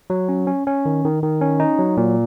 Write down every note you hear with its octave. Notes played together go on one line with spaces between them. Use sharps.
F#3
C#4
C#4
C#4
D#3
D#3
D#3
C#4
D#4
F#3
A#2